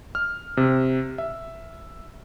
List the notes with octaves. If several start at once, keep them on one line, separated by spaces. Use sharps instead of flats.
F6
C3
E5